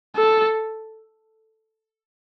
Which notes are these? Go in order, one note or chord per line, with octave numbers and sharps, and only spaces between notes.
A4